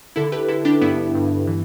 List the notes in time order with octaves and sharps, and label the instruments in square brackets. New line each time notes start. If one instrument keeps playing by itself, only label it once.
[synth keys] D3 E4 A4
G4 B4
D3 E4 A4
D4 G4
G2 B3 E4
G2
E3